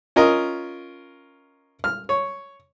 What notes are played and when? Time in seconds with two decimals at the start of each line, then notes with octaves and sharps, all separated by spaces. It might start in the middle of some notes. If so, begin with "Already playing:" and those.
0.16 C#4 F4 A#4 D#5
1.84 F6
2.09 C#5